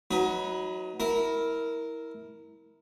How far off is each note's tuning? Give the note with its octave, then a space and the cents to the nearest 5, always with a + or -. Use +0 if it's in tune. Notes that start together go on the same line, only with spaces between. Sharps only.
F#3 +0 D#4 +30 B4 +0
E4 -20 A#4 +0